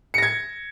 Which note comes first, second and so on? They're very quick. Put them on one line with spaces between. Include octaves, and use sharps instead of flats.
C#7 A#6 G#6